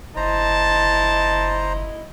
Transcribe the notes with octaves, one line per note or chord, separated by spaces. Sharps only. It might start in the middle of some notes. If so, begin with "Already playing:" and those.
F#1 E4 C5 D#5 A5 A#5